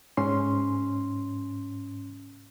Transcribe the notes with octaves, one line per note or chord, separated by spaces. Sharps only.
G#2 C#4 C6